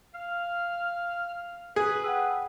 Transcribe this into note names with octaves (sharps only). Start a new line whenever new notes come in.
F5 F6
G#4 B4
F#5 G5 E6